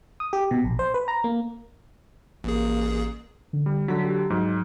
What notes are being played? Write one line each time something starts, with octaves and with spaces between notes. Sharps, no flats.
D#6
G4
B2
A#1
C5
B4
A#5
A#3
A1 A#3 G#4
D3
G3
D3 F#3 B6
G4
G#2 F#3